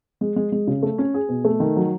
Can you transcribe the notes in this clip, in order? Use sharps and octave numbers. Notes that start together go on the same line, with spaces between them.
G#3
G#3
G#3
C#3
A3
C#4
G#4
B2
A3
D#3
F#3